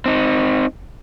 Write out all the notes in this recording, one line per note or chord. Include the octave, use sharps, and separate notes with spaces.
C4 D#4